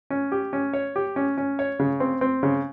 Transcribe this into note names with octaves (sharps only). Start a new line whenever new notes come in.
C#4
G4
C#4
C#5
G4
C#4
C#4
C#5
C#3
C4
C4
C#3